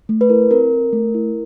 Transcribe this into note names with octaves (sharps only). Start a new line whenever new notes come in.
A3
B4
E4 A#4
C4 A#4
A4
A3
E4